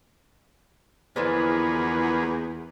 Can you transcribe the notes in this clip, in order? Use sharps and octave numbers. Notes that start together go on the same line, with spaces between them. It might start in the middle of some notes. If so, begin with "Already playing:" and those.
E2 D3 E3 F3 A#3 G#4 B4